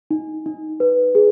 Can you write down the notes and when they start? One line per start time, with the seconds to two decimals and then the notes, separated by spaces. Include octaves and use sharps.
0.11 D#4
0.46 D#4
0.80 B4
1.15 G#4